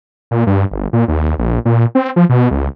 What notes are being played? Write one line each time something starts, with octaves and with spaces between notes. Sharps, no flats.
A#2
G2
G1
A#2
D#2
A#1
A#2
C4
F3
B2
C#2